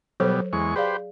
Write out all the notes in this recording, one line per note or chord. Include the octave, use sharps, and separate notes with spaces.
B2 F#3 G3 A4 C5
E2 G#3 C#6
G4 G#4 B4 C5 D5 F5